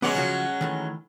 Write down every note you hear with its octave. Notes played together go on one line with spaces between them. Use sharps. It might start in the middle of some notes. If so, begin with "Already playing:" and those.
F#3 G#3 B3 C#4 D5 F#5
C#3 F3 F#4
D#3 E3 A3